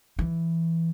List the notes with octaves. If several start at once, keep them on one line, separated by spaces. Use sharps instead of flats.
E3